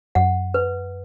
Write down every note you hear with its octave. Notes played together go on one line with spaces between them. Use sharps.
F#2 F#5
B4